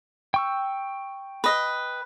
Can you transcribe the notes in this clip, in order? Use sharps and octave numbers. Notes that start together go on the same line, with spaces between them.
G5 C#6 E6
B4 D#5